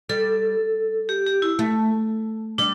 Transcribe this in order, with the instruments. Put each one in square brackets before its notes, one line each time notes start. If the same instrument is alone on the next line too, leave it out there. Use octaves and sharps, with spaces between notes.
[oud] G3 [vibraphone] A4
[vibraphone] G4
G4
E4
[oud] A3
[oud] G3 [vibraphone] D4